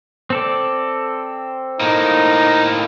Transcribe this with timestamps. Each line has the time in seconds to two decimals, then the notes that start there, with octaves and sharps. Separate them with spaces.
0.30 C4 A4 D5
1.81 A2 A#3 D#4